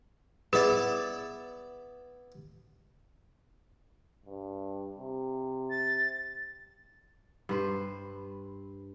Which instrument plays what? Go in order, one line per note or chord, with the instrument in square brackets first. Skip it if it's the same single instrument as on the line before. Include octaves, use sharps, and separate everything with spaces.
[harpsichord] B3 E4 D5 [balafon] G#4
[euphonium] G2
C3
[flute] A6
[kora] G2 B4 C5